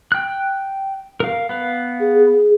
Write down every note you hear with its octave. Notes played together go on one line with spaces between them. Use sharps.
G5 F#6
A#4 F5
B3 B4 F5
G#4
G#4